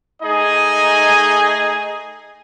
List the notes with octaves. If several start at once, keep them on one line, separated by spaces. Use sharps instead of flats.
A3 D#4 G#4 D#5 G#5